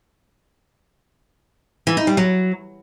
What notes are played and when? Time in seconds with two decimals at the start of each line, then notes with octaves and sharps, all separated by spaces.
1.87 E3
1.97 D#4
2.07 G3
2.17 F#3